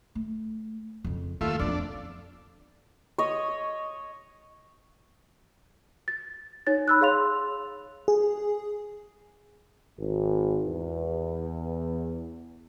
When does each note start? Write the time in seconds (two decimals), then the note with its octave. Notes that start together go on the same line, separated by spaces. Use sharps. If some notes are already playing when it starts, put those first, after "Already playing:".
0.15 A3
1.04 F2 C#3
1.41 D#2 A3 F4 E5
1.59 F2 B3 D4
3.18 C#5 D#5
6.08 A6
6.67 D#4 C#5 A6
6.88 B5 E6 F#6
7.01 G#4 C#5 F5 C6 F7
8.08 G#4
9.98 G#1
10.65 E2